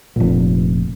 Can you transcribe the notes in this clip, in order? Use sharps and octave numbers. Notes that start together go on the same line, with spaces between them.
F1 A#1